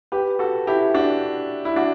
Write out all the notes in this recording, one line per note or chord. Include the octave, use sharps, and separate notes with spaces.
G4 B4
F#4 A4
E4 G4
D4 F#4
E4
D4 F#4